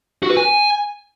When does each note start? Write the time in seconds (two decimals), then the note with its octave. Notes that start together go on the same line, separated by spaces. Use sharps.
0.23 F#4
0.30 B4
0.37 G#5